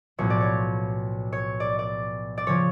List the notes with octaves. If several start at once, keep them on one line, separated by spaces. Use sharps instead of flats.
B1 A2 F3 C#5
D5
C#5
C#5
D5
D5
D5
C#3 F3 C#5